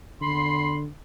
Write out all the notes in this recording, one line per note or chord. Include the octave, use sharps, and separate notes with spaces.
E2 D3 B5 C6